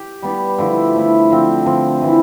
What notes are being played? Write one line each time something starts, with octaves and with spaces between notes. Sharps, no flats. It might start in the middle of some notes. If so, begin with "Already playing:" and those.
Already playing: G4
G3 B3 D4 G4
D3 F3 A3 E4
D3 F3 A3 E4
D3 F3 C4
D3 F3 C4
E3 A3 E4